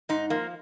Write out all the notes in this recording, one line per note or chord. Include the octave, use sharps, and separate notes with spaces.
G#2 D#4
F3 A#3